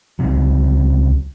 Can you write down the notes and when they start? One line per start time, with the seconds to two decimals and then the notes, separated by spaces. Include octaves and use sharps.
0.19 C#2 C3 F#3